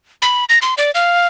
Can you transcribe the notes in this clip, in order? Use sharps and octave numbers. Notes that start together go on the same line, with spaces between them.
B5
A#6
C6
D5
F5